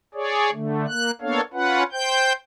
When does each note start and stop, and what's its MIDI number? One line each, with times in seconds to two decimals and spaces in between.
0.14 0.50 68
0.14 0.50 73
0.14 0.50 74
0.52 0.86 50
0.52 0.86 57
0.88 1.11 58
0.88 1.11 90
1.21 1.41 58
1.21 1.41 59
1.21 1.41 62
1.21 1.41 69
1.21 1.41 73
1.21 1.41 77
1.54 1.83 61
1.54 1.83 65
1.54 1.83 71
1.54 1.83 78
1.92 2.33 72
1.92 2.33 79
1.92 2.33 91